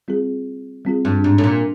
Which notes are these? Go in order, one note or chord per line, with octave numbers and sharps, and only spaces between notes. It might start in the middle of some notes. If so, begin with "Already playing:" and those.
G3 C4 F4 G#4
G3 C4 F4 G#4
G2
G#2
A2
A#2